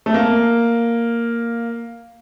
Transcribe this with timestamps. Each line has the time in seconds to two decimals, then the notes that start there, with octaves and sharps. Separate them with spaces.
0.06 A3
0.14 A#3